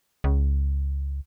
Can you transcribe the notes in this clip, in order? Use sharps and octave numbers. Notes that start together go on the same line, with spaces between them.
C#2